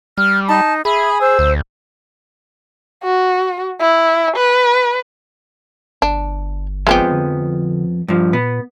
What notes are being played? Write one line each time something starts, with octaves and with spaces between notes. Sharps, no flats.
G3 F6
D#4 A5
G#4 E5 B5
C5 E6
D2
F#4
E4
B4
G1 D4
F2 F3 G#3 B3 C4 G4
D3
G2 F3
A#2 B3